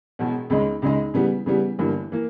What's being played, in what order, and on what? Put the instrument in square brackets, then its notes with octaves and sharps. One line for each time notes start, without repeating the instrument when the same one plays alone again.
[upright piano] E1 E2 B2
C#2 C#3 G#3 D#4
C#2 C#3 G#3 D#4
C#3 E3 G3 B3
C#3 E3 G3 B3
G1 G2 E3 A#3
E3 A#3